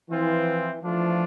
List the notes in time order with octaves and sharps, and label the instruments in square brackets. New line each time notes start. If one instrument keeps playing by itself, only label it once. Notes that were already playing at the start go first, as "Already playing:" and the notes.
[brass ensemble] E3 [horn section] F3 C4 F4
[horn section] E3 A3 D4 F4 [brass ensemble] F3